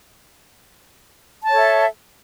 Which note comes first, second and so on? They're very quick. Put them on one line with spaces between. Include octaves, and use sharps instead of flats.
A5 C#5 A4 E5